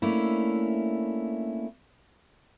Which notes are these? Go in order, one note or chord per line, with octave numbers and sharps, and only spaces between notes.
A3 A#3 C#4 D4 E4